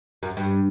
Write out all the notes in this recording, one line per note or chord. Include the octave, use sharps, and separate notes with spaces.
F#2
G2